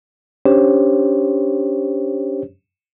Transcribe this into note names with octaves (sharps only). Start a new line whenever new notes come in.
C#4 D4 G4 C5 C#5